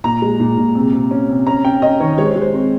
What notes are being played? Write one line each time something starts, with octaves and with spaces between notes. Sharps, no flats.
A#2 A#5
G#3
A#2
A#2
C3
C3
C#4
C3
C#4 A#5
C#4 G5
C#4 D#5
D#3 C#5
G#3 C#5
C5
G#3
C5
C4